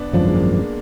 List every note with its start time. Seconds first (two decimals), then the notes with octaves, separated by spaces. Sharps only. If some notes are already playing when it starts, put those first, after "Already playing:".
Already playing: B3 D4
0.13 G#1 F#2 F3 D4
0.25 G#3
0.33 A#3